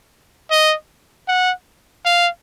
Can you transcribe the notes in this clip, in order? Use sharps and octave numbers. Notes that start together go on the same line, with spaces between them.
D#5
F#5
F5